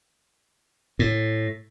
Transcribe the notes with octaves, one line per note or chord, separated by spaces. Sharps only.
A2